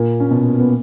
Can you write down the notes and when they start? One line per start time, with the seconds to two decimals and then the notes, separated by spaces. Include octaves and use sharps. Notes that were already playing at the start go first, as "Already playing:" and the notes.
Already playing: A#2 A#3
0.20 C#4
0.31 B2 B3
0.59 B3